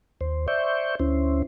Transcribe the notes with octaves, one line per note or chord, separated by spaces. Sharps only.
D#2 C5
C5 D5 E5 C#6 G6
D2 C#4 E4 C5